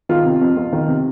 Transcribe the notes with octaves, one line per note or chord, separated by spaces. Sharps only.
D#3 F4
C3
F2
F2
D#3
C3